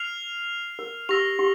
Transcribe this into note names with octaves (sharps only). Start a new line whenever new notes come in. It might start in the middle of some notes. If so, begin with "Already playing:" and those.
Already playing: F6 C7 F7
A#4
G4 E6 A#6 F7
G4